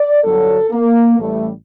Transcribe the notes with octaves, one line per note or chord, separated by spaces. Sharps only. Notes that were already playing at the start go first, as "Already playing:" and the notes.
Already playing: D5
G1 G2 F#3 A4
A#3
A1 A2 G3 A3